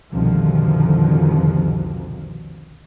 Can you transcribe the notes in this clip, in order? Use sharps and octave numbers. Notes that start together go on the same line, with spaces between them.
C2 F2 B2 D3 D#3 F3